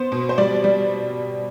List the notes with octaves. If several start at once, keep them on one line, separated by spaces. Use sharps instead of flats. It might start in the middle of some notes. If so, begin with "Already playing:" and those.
Already playing: B3 C5
B2
C5
G3 D5
G3